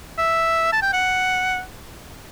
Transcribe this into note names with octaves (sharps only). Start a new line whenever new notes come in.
E5
A5
G5
F#5